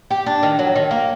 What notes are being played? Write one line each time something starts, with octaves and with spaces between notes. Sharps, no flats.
G4
D4
D#3
F#3
D#3
A#3